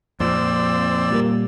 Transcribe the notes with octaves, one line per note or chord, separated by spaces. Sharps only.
F2 A#2 C4 D5 E6
A#2 G3 A#3